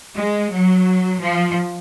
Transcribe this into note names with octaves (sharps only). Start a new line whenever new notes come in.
G#3
F#3
F3